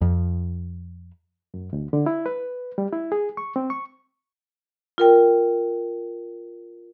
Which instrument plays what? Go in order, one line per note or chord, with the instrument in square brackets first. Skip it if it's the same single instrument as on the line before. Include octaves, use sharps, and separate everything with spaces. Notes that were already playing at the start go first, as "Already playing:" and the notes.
[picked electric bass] F2
[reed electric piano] F#2
D2
D3
E4
B4
G3
E4
G#4
C#6
C4
C#6
[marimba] F4 A#4 G5